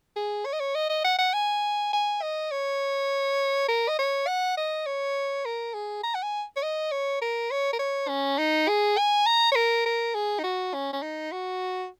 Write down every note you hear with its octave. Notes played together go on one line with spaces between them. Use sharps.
G#4
C#5
D#5
C#5
D#5
D#5
F#5
F#5
G#5
G#5
D#5
C#5
A#4
D#5
C#5
F#5
D#5
C#5
A#4
G#4
A#5
F#5
G#5
C#5
D#5
C#5
A#4
C#5
A#4
C#5
C#4
D#4
G#4
G#5
A#5
C#5
A#4
A#4
G#4
D#4
F#4
C#4
C#4
D#4
F#4